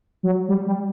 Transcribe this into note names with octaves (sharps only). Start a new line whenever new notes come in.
F#3
G3
G3